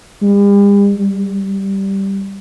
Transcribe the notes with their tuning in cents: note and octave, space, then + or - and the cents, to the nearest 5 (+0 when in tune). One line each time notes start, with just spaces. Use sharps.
G3 +45
G3 -5